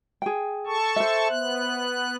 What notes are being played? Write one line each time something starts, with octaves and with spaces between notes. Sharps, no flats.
G#4 G5
A4 A5 C#6
C5 E5
B3 F#6